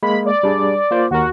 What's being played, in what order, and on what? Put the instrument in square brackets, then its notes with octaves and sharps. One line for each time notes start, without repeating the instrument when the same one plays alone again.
[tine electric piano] G#3 A#3 [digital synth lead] B5
[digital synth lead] D5
[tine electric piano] G3 D4 G#4
A#3 F4 C5
[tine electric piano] D#2 A#4 [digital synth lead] F#4